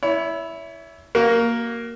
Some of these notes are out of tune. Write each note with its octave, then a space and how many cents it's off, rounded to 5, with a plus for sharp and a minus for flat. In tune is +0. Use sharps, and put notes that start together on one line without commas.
E4 +0 C#5 +35
A#3 +0 F#4 +30